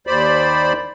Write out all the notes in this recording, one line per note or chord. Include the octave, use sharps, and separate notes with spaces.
D#2 C5 D5 B5